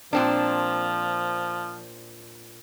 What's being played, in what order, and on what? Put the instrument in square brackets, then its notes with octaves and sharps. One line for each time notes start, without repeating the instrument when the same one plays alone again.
[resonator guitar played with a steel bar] A#2 C4 D4 [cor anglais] F3